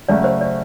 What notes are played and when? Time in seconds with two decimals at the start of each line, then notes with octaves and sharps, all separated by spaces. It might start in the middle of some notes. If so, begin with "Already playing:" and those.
0.09 C#3 F#3 A3 D5
0.24 C5
0.41 D5